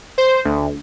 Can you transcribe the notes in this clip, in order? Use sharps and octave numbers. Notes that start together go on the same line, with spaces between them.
C5
D2